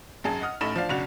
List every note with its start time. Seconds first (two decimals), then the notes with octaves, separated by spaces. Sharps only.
0.24 G#1 F#2 G#4 A5
0.41 D#5 F#5 D#6 F6
0.61 A1 A3 D#4 B5 E7
0.76 F3 D4 F5
0.89 F#1 B1 C#3 D4 F#4 F7